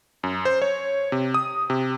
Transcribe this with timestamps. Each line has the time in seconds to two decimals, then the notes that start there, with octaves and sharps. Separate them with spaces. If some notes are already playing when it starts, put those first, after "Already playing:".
0.23 F#2
0.45 C5
0.62 C#5
1.12 C3
1.34 D#6
1.70 C3